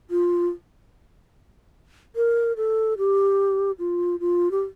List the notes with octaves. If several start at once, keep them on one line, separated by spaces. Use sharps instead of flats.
F4
A#4
A4
G4
F4
F4
G4